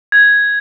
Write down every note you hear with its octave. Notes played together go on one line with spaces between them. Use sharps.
G#6